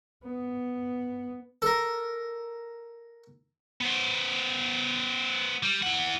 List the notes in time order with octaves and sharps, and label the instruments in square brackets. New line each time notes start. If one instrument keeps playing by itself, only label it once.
[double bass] B3
[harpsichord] A4 A#4
[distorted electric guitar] B3 C5
G3
E4 F#5